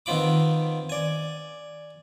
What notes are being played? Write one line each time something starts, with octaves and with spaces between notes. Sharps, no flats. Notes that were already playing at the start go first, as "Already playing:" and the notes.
D#3 B3 C4 F4 B5 D6
D5 G#5